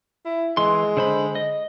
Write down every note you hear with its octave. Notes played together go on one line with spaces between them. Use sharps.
E4
E3 G#3 C6
D3 C5 B5
D#5